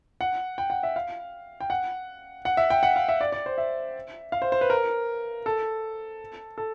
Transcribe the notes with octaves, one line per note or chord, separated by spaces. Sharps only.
F#5
G5
F#5
E5
F5
G5
F#5
F#5
E5
G5
F#5
F5
E5
D5
D5
C5
E5
F5
C5
C5
B4
A#4
A4
A4